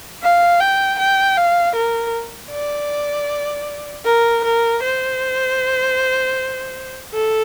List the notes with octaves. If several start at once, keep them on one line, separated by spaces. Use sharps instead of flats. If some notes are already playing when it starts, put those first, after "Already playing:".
F5
G5
G5
F5
A#4
D5
A#4
A#4
C5
A4